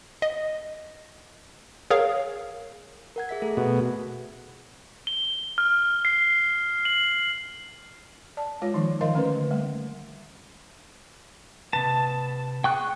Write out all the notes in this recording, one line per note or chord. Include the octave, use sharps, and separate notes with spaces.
D#5
G#4 A#4 C#5 F5
A#4 F#5 G#6
G#4 E5 B6
A3 G#4 A4
B2
G7
F6
C7
F#7
D5 A5
G#3 F4 C#5
D#3 F3 D#4
D#3 F3 A#4 D#5 F5 C6
D3 A3 C#4 A#4 B4
G3 A3 A#3
C3 B4 A5
G#4 G5 C#6 F#6